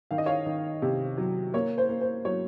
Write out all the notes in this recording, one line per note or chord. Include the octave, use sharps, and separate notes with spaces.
D#3 F5
D#5
C#5 F5
D#3
C3
F#3
A#3 C#5
C5
A#3
C5
F#3 C#5